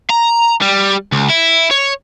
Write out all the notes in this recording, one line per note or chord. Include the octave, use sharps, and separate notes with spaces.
A#5
G3
C#2
E4
C#5